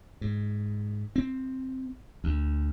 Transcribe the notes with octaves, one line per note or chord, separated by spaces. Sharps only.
G#2
C4
D2